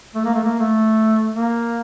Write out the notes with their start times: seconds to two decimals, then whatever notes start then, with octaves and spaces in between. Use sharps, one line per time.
0.15 A3
0.25 A#3
0.35 A3
0.44 A#3
0.59 A3
1.34 A#3